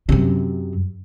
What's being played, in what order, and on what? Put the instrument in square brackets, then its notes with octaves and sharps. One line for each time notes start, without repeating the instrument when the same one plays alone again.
[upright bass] F#2 C3